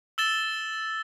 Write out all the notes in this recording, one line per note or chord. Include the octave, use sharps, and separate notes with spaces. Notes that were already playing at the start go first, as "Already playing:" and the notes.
E6 A6 E7 G7